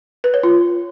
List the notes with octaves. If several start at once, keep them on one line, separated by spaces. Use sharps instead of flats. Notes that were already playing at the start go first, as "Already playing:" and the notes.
B4
C#5
F4